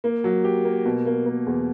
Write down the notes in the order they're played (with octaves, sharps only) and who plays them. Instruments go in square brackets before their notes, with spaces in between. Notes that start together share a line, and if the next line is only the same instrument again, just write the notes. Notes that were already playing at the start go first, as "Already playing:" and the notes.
[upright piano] A#3
F#3
G4
A#3
B2
A#3
A#3
E2